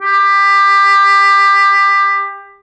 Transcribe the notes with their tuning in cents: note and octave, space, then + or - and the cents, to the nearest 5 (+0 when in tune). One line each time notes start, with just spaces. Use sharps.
G4 +20